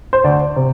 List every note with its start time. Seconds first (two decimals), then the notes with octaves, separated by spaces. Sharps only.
0.13 C5
0.24 D2 D5
0.56 C3